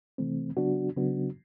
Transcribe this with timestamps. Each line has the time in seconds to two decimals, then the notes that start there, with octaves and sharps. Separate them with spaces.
0.18 C3 E3 A3 C4
0.57 C#3 F#3 B3 D4 F#4
0.97 C#3 F#3 B3 D4 F#4